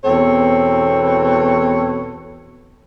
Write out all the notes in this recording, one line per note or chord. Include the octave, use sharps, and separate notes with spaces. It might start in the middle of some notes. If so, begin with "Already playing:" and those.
E2 B2 C4 A4 C#5